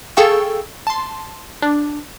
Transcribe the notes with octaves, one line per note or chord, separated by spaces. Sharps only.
G#4 A4 F5 G5 C#6 E6
A5 C6
D4